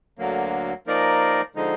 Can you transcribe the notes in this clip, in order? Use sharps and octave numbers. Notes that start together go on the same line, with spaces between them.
D2 D3 F#3 A#3
F3 A#3 D#4 A#4 D5
D3 F3 G#3 D#4